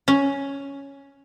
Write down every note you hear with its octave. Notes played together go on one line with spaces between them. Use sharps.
C#4